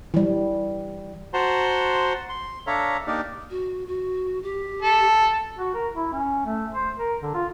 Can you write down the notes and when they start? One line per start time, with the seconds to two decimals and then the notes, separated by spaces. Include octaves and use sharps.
0.14 E3 G3
1.34 F#4 C5 F#5 A5 A#5 C6
2.29 C6
2.67 D4 A4 C#5 E5 F5 A#5
3.07 A#3 D4 D#4 G4 A#4 D5
3.50 F#4
3.87 F#4
4.43 G4
4.83 A4
5.59 F#4
5.75 A#4
5.94 E4
6.13 C#4
6.46 A3
6.72 C5
6.98 A#4
7.22 D3
7.34 F4